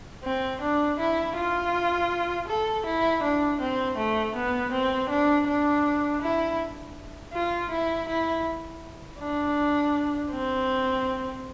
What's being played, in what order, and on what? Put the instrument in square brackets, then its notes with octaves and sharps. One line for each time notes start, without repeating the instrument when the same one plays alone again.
[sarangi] C4
D4
E4
F4
A4
E4
D4
C4
A3
B3
C4
D4
D4
E4
F4
E4
E4
D4
C4